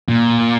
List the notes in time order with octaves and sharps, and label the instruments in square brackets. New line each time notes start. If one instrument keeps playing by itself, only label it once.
[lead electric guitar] A#2